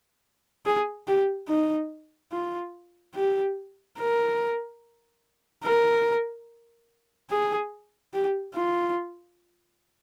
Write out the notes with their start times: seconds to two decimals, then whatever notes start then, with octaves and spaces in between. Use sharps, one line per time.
0.66 G#4
1.08 G4
1.49 D#4
2.32 F4
3.15 G4
3.98 A#4
5.64 A#4
7.30 G#4
8.14 G4
8.55 F4